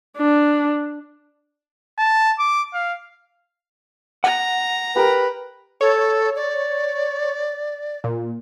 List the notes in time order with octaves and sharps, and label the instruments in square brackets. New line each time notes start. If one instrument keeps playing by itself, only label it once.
[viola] D4
[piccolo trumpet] A5
D6
F5
[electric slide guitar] F#5 [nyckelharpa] A#5
[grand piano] G4 A#4 [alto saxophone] B4
[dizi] A4 [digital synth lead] C#5
[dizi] D5
[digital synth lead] A#2